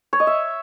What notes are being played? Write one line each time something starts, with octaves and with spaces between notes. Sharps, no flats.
C#5
D#5
E5